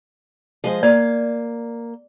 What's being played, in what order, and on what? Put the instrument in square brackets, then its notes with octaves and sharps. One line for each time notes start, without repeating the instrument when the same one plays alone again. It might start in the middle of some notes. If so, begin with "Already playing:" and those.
[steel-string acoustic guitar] F3 G#3 C5
[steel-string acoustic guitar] A#3 [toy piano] D5